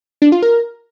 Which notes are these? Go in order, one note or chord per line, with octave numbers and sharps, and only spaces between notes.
D4
F4
A#4